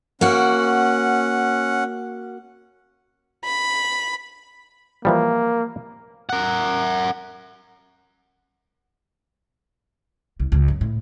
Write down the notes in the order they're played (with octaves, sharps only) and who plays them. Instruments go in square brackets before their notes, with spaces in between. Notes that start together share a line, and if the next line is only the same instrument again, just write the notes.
[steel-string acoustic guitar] A#3 F#4 [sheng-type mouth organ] C#4 F#5
[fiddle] B5
[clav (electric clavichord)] E3 F3 G3 [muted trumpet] A#3
[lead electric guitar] A#4 F#5
[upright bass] C2
C#2
F#2
A2